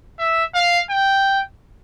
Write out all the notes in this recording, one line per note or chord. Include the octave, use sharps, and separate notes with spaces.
E5
F5
G5